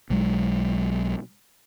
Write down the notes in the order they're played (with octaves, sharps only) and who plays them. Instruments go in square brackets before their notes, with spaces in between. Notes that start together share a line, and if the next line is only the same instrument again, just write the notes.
[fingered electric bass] B1 F#3 G#3